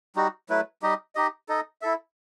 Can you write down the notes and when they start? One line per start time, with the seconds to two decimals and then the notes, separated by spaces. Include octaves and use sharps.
0.16 G3 D#4 F#4
0.49 F#3 A3 E4 B4
0.82 G3 D#4 G4 D#5
1.15 D#4 G4 D#5
1.49 D#4 A4 D#5
1.82 E4 A4 E5